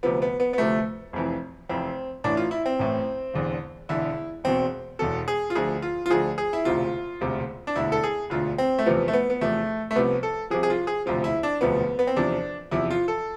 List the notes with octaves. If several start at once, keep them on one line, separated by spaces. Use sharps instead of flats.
D2 C3 F3 B3
B3
B3
B3
D2 C3 F3 A3
F1 F2 E3
F1 F2 E3 C4
A1 A2 E3 D4
F4
E4
C4
A1 A2 E3
E1 E2 D3
E1 E2 D3 E4
E1 E2 B2 C4
E1 E2 B2 A4
G#4
F4
D2 D3 F3 G#4
F4
F4
D2 D3 F3 G#4
G#4
E4
E1 D2 C3 F4
E1 D2 C3
D4
E1 D2 D3 E4
A4
G#4
E1 D2 D3 F4
C4
A3
E2 C3 F3 B3
A3
B3
B3
E2 C3 F3 A3
A3
C2 C3 F3 B3
A4
C2 C3 F3 G#4
G#4
F4
G#4
E1 D2 C3 F3 F4
E4
D4
E1 D2 C3 F3 B3
B3
C4
E2 C3 F3 D4
E2 C3 F3 E4
F4
A4